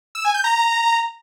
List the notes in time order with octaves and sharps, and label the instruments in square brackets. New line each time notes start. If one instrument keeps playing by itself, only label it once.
[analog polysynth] E6
G#5
G6
A#5